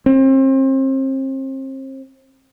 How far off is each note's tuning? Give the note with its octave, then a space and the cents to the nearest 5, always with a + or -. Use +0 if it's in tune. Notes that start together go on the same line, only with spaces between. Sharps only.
C4 +35